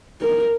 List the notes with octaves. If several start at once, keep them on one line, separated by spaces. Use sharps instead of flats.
A#4